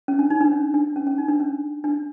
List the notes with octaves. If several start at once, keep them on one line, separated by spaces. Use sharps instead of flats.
C#4
D4
D#4
D4
C#4
D4
C#4
C#4
D#4
D4
C#4
D4